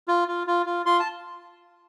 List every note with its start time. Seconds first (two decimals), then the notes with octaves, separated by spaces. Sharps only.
0.08 F4
0.28 F4
0.47 F4
0.66 F4
0.86 F4 C6
1.00 A5